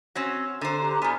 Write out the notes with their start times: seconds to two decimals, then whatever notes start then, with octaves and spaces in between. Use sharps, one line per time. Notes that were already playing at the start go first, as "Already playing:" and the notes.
0.15 C4 C#4 F#4
0.61 D3 C5 A#5 F#6
0.80 G4 A#5 F#6
1.02 A2 B3 D5 G#5 F6